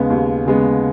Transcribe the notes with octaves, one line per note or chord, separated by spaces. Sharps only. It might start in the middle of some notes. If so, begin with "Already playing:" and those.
Already playing: D#2 C#3 G#3 B3
D#2
C#3 G#3 B3